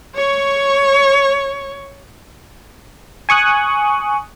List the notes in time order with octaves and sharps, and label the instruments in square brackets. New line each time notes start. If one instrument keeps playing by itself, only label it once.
[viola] C#5 C#6
[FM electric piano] G#5 C#6 D#6 F#6